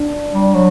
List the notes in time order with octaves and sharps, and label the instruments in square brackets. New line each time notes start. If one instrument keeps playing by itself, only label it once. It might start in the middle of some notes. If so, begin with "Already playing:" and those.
Already playing: [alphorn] D4
[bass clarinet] G3
F#3